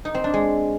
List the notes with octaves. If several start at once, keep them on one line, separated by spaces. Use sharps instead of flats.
D#4
C4
D4
G#3